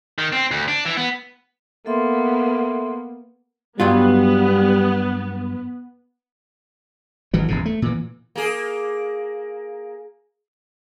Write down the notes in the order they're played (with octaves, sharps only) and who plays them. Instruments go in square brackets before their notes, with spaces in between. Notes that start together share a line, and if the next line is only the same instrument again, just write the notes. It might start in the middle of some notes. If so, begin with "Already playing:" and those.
[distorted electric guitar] D#3
C4
D2
D4
E3
B3
[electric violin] A#3 B3 [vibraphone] A4 E5 C6
[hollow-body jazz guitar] G2 F#3 F4 [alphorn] G3 [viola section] B3
[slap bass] G#1 E3 F#3
D#1 G2 C#3
A3
A#2 E3
[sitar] A#3 G#4